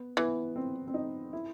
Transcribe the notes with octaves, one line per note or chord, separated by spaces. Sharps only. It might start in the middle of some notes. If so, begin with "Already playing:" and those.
Already playing: B3
E3 B3
C4
C4
D#4
E4